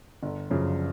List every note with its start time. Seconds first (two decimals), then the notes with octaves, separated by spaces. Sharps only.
0.23 G1
0.50 F#2 C#3 F3